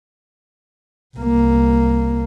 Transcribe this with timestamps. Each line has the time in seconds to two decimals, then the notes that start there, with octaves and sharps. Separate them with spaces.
1.17 C2 A#3